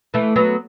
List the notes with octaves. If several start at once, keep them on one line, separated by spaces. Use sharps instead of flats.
E3 A3
F#3 B3